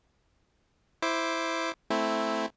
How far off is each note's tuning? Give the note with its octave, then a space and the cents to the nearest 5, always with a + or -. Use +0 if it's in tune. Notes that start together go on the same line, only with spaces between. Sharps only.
E4 +0 C5 +0 D6 +0
A3 +0 C4 +0 E4 +0